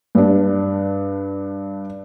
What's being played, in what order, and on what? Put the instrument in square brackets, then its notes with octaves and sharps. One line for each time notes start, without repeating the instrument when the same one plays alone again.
[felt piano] G2 D4